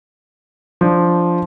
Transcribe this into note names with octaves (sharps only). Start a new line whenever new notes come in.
F3 D4